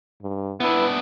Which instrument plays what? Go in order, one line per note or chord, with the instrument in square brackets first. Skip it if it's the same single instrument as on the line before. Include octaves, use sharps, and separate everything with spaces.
[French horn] G2
[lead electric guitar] B3 D4 [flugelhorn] E4 [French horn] B4